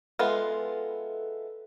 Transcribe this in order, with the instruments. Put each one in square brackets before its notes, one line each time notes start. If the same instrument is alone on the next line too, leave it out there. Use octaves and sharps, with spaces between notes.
[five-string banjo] G#3 B3 F4 [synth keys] A4 B4 E5